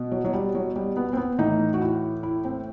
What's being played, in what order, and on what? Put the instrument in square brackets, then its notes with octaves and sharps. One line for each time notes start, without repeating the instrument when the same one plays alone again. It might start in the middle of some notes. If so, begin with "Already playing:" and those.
Already playing: [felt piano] B2
F#3
F#3
G3
F#3
G3
B3
C4
B3
A2 E3 D#4
F#4
E4
E4
C4